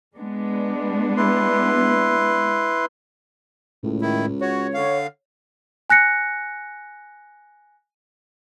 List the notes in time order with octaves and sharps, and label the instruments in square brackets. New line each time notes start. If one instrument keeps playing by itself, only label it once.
[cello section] G#3 B3 D4
[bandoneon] E4 B4 C6
[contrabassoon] C#2 [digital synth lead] A2
[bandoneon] D#3 E4
[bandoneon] F#4 [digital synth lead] C#5
[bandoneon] D3 F5
[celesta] G#5 F#6 A#6 C#7